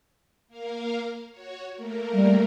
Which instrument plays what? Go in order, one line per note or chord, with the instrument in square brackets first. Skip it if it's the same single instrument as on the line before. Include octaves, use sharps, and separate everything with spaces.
[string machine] A#3 A#4 F5
F#4 C#5
A3 A#3 A#4
[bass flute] G3